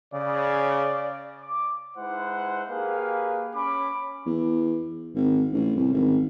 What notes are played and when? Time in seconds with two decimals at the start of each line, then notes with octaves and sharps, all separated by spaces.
0.14 C#3 D5
1.40 D6
1.97 G#3 D#4 E4 B4 C5 F#5
2.69 A#3 G4 G#4 B4 F5
3.55 C#4 B5 D6
4.26 E2
5.15 G#1
5.53 A1
5.76 C2
5.93 G#1